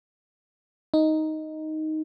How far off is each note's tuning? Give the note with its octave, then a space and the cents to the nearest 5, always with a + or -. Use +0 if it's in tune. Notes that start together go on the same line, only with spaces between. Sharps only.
D#4 +5